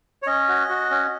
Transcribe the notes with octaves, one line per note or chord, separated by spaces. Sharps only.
C#5
C#4 D#5
F#4
F#4
C#4